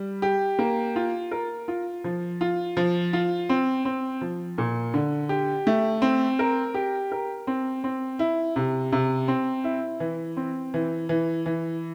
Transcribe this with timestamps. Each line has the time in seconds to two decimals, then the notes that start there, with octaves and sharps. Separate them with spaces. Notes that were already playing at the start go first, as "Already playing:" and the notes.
Already playing: G3
0.22 G4
0.59 A#3
0.96 F4
1.31 A#4
1.68 F4
2.04 F3
2.41 F4
2.77 F3
3.13 F4
3.49 C4
3.85 C4
4.21 F3
4.58 A#2
4.94 D3
5.29 G4
5.67 A3
6.02 C4
6.39 A#4
6.74 G4
7.12 A#4
7.47 C4
7.84 C4
8.19 E4
8.56 C3
8.92 C3
9.28 C4
9.64 E4
10.00 E3
10.37 C4
10.74 E3
11.09 E3
11.46 E3